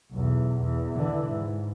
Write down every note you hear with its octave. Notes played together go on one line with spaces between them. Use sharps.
B1 E2
E2
D3 E3
G#2